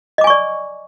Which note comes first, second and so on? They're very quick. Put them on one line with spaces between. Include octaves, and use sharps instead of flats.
D#5 D6 G#5 C#6 D5